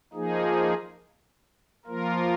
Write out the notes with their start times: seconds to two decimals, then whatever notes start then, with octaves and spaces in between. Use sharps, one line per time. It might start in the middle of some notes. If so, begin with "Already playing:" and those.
0.13 F3 A#3 D#4 G#4
1.85 F3 A#3 F4 A#4